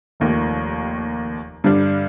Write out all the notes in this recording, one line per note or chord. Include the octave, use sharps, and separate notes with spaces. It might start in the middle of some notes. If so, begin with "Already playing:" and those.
F1 D#2 D#3 A#3
G2 D3 G3 D4